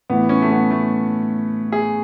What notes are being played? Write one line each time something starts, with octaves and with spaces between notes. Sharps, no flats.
A2 E3 B3
C#4
A3
B3
A3
G#4